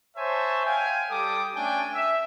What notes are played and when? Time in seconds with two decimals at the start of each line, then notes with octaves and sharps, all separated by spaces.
0.17 C5 C#5 E5 G#5 A5
0.66 F5 G5 G#5
1.11 G3 A4 G5 D6 D#6
1.56 A3 C#4 D4 G5 G#5
1.94 E5